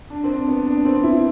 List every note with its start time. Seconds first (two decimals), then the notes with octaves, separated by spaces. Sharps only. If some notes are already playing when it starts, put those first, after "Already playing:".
0.10 D4
0.24 C4
0.29 D4
0.48 B3
0.67 D4
0.85 C4
1.03 E4